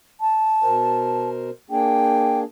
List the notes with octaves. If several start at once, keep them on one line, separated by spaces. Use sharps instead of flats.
A5
B2 A#4 C5
A#3 D4 G#4 G5